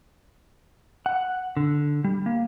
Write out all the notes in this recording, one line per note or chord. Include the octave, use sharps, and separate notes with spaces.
F#5
D3
G3
A#3